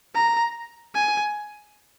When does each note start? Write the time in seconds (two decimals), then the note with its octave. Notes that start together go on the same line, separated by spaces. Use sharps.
0.15 A#5
0.95 G#5